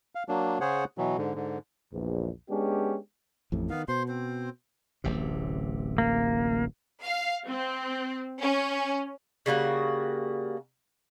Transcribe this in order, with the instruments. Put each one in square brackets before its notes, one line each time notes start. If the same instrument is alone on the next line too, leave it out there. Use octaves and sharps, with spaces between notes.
[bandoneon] F5
F#3 A#3 D4
C#3 G#4 C5 C#5 F#5
B2 E3 F#3
G#2 D3
G#2 D3
[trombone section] A#1 E2
G#3 B3 C#4 D4 G4
[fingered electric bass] A1 F2 A2
[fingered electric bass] D#3 [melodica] B3 F5
[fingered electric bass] B2 [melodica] C5 C6
[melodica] C4 C5
[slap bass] D1 A1 C3
[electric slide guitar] A#3
[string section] F5
C4
C#4
[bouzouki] C#3 G3 A#3 F#4